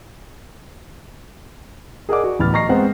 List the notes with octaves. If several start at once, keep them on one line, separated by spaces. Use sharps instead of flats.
G#4 A#4 D5 D#5 F#5 D6
F#4
D1 E3 B3 B5 F6 A6
D#5 A#5 C#6 A#6 C7
G#3 B3 C4 C5 F#5